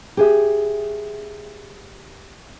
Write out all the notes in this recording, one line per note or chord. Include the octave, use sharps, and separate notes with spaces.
G4 G#4 E5